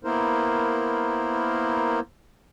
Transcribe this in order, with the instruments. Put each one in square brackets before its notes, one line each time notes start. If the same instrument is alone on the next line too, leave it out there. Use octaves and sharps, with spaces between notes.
[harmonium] A#3 B3 E4 A#4 C5